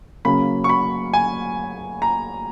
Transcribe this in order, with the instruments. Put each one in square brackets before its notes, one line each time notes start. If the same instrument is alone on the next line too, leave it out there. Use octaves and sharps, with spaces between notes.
[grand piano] C#3 F#3 A#3 C#4 B5
C#6
B5
G#5
A#5